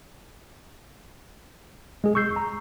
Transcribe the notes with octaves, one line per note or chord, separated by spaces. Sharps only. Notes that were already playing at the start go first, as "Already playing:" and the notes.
G#3 G#4
C#6 E6 G6 C7
A#5